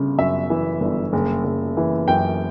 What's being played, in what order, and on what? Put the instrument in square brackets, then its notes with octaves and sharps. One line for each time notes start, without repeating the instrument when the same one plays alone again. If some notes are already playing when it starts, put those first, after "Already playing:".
Already playing: [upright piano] G1 C#3
F#2 E5
E3
G1
F#1
F#1
E3
F#2 G5